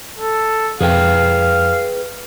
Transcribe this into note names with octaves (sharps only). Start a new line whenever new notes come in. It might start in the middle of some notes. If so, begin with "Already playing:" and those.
A4
F2 G#4 B4 F5 G5